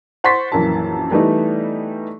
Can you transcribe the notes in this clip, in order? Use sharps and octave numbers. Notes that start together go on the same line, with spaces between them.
C5 F#5 C6 C#6 A6 B6
A#1 F#2 E3 A#3 A5
E3 G3 A3 B3 D#4